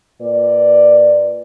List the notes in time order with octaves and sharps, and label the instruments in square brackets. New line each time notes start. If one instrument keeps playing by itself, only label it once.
[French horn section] A#2 B4 D5